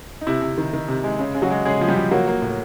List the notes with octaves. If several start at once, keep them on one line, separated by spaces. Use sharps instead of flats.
D#4
C3 E4
C3
D#3
D#3
C3
G#3
C#3
C#3
F#3 F#4
G#3
C#3 G#3 G#4
F3
G3 G4
F3
F#3 A#3 F#4
A#3
A2